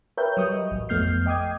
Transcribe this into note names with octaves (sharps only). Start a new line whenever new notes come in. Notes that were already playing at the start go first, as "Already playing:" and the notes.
A#4 B4 C#5 E5 G5 G6
F#3 G3 C#6 D#6
D#5
A1 F#3
F2 A3 B3 F6 G6 C7
D#5 G5 D6 D#6 G#6